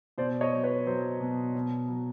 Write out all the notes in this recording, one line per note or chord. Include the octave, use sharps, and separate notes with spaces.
B2 C5 D5
C#5 D#5
F#3
B4 C#5
F#3 C5
B2
B2
F#3